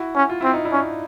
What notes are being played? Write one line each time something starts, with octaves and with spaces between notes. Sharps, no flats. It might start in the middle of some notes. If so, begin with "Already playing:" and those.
Already playing: E4 F#4
C#4
F4
C4 E4
D#4
D4 E4
C#4